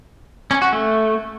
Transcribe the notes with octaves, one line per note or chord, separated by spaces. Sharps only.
C#4
F#4
A3